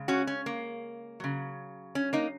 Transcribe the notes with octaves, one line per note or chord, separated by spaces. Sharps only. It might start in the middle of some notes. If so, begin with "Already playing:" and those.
Already playing: C#3 G#3
C#4 F#4
C#4
A#3
C#3 F#3
C#4
A#3 D#4